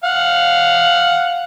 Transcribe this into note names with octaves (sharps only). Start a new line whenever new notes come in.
F5 F#5